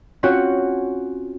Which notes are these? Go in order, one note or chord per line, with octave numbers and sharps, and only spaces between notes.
C4 C#4 F4 F#4 C#5 F#5